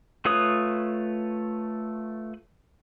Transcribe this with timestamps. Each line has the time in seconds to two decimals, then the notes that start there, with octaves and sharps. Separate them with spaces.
0.25 A3 F4 B4 C#5 D#6